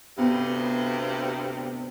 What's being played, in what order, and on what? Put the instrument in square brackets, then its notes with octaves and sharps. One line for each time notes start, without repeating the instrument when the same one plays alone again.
[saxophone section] D2 G2 C3 [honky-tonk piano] B3